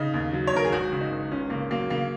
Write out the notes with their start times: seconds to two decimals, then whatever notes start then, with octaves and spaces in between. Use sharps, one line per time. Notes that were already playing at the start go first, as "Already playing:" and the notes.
Already playing: C#3 D#4
0.14 D#2
0.33 F#3
0.47 C#5
0.53 D#2 A#4
0.65 G#4
0.72 G#1 F#4
0.92 C#3
1.01 D#4
1.11 G#1
1.31 C#2 C#4
1.50 C#3 A#3
1.70 F#3 A#3
1.90 C#3 A#3